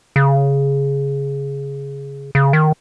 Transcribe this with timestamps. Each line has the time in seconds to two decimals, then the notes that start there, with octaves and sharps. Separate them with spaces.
0.16 C#3
2.35 C#3
2.53 D#3